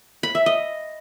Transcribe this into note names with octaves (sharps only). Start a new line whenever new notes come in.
B5
E5
D#5